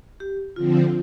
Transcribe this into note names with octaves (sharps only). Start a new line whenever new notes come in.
G4
D3 F3 C4 F4